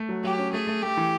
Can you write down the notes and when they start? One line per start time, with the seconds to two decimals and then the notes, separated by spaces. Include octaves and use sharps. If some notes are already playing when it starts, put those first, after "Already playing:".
Already playing: A3
0.09 F#3
0.23 F#3 G4
0.38 C#4
0.53 A3 G#4
0.67 A3
0.83 A3 G4
0.97 E3